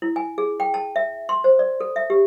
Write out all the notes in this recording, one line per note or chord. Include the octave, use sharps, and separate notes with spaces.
E4
G#5
G#4
G5
A5
E5
C6
C5
D5
A4
E5
G4